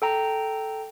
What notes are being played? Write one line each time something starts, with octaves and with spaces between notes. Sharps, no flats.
A4 G5 A#5